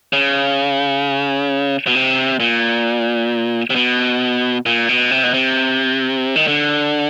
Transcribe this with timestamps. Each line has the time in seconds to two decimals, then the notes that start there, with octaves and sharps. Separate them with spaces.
0.13 C#3
1.87 B2
1.95 C3
2.40 A#2
3.70 C3
3.76 B2
4.66 A#2
4.89 B2
5.11 C3
5.23 B2
5.34 C3
6.36 D#3
6.48 D3